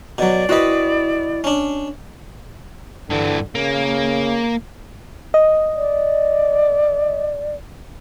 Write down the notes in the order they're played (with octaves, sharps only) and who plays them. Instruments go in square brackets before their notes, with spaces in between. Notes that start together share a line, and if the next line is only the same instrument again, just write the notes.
[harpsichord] B2 F#3 [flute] D5
[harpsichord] C4 B4 [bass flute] E4 [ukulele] F#4 D#5
[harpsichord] C#4 D4
[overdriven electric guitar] G2 E3 [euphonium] D3
[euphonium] C#3 [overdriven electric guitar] A#3
[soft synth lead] D#5
[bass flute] D5